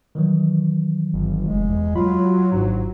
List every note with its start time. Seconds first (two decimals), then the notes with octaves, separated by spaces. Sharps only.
0.15 D#3 E3 F#3
1.14 G1
1.47 F1 G#3
1.69 E2
1.96 F#3 F4 B5
2.52 G#1 G#2 D4 A#5